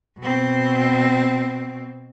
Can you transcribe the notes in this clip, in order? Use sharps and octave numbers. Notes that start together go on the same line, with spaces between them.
B2 C4